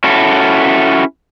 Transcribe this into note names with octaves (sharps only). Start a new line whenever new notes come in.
C#4 E4 F#4 A4